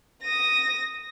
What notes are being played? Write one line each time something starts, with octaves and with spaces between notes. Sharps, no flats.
D#6 A#6